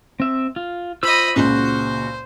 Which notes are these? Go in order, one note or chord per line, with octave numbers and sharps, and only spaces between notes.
C4 E5
F4
F4 C5 D#5 B5 E6
C#2 A#2 C#3 F#4 C5